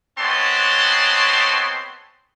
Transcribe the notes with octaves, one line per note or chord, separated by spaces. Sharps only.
G#3 B3 C4 C#5 A5 C6